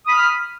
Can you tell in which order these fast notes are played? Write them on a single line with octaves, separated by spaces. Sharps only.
D#6 B5 F6